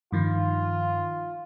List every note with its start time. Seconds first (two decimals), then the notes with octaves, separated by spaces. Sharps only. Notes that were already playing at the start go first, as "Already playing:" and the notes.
0.12 G2 D#3 F3 F4